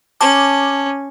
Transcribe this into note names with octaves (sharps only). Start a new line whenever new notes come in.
C#4 A5 D6